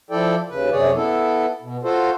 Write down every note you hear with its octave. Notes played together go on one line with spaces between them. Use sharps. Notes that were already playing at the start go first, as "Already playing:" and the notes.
F3 E4 A4 D5 G5
D#2 C#3 B4
F#2 C3 G#4 C#5 D5
B3 E4 A4
B2
F4 F#4 A4 C5